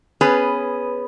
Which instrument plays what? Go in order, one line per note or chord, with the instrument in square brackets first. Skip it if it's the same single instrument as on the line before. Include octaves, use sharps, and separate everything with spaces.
[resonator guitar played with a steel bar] B3 C#4 G#4 B4